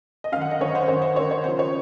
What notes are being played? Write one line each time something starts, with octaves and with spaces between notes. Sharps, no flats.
D#5
F#2 D#3 F5 F#5
D#5
F#2 D#3 C#5
C5
F#2 D#3 C#5
C5
F#2 D#3 C#5
C#5
F#2 C#3 F3 C5
C#5